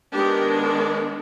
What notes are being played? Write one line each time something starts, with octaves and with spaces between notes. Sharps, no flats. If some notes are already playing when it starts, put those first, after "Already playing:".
D#3 G#3 B3 D4 G4